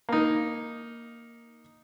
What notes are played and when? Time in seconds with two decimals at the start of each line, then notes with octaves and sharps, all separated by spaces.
0.09 A#3 D#4